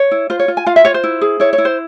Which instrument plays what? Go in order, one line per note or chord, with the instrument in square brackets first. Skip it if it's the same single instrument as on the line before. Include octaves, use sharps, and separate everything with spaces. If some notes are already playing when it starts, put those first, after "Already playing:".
Already playing: [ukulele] C#5
E4
F4 C5
C#5
F4
G#5
F4 F5
E5
F4 C#5
C5
E4
G#4
E4 C#5
C#5
E4
C5